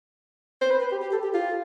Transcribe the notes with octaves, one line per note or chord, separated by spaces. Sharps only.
C5
B4
B4
G4
G4
A4
G4
F4